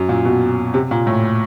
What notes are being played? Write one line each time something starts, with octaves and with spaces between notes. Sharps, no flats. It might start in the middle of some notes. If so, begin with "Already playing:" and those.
Already playing: F#2
A#2
B2
C3
A#2
A2